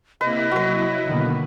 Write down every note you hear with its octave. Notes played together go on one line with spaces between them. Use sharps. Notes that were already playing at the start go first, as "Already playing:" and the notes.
C3 A#3 E4 B4 D#5
F#3 E4 F#4 B4
B2 D3 D#3 A#3